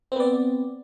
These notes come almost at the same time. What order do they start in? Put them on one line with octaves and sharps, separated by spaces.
C4 B3 D5